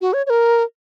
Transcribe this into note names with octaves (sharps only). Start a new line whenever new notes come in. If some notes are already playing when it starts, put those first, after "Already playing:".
F#4
C#5
C#5
A#4